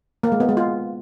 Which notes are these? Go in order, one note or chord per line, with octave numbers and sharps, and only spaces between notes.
A#3
G#3
B3
G#3
F4